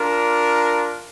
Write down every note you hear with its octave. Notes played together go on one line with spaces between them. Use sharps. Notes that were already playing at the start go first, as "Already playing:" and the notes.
Already playing: D4 F4 A#4